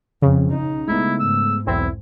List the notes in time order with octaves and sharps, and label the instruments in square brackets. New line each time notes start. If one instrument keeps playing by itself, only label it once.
[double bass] F2 [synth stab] C#3
[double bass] D#4
[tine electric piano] G#3 A3 B3 [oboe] E4
[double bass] G#2 [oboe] E6
[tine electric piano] B1 E2 [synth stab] C4 [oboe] E4